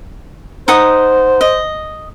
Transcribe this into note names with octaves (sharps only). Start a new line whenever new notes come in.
D#4 C5 F#5 D#6
D#5